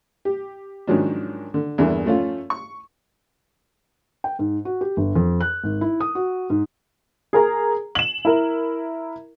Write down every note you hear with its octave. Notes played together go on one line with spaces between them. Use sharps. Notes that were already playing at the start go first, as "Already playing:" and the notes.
G4
G#2 D#3 F3 F#3 C#4 D4
D3
E2 G2 D3 E3 A#3
F3 A3 C#4 F4
C#6
G5
G#2
F#4
G4
G1
F2
F#6
G#1
E4
D#6
F#4
G#2
G#4 A#4 A#5
E7 F#7
E4 A#4